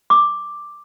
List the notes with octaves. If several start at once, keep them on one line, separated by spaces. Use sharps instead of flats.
D6